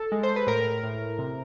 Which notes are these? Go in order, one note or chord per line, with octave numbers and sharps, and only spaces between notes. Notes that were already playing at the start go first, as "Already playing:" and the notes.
Already playing: A4
G#3
C5
B4
A2 A#4
A2
C3